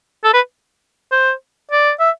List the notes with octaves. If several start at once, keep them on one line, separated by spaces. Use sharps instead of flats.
A4
B4
C5
D5
E5